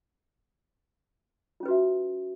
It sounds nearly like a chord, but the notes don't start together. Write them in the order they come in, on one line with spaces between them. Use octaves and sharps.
F4 C#4 B4 F#4 E5